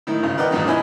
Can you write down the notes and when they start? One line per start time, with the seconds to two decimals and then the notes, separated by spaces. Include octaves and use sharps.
0.07 A2 D#3 E4
0.23 G#1 C#3
0.37 A#4 B4 D5 D#5 F#5 G5
0.51 A1 E2 A#2 D#3 G3
0.67 C#4 E4 D#5 G#5 B5